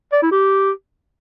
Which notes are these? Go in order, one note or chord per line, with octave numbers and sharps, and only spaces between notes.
D5
E4
G4